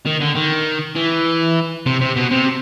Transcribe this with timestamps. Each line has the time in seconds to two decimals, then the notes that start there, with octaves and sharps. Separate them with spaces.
0.06 D#3
0.21 D3
0.36 D#3
0.96 E3
1.86 C3
2.01 C3
2.16 B2
2.31 C3